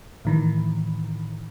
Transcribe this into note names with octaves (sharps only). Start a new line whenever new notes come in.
A2 D#3 E3